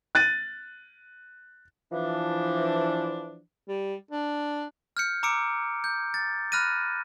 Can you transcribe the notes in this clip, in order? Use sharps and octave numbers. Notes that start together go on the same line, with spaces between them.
F#6 A6 D#7
E3 F3 D4
G3
D4
F6 G6 C#7
A#5 D6 E6 C#7 D7
G6
A6
B5 F6 F#6 A#6 D#7